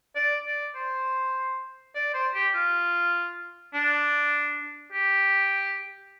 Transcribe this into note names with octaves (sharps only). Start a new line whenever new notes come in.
D5
D5
C5
D5
C5
G4
F4
D4
G4